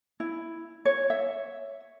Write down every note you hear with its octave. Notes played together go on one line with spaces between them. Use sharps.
E4
C#5
E5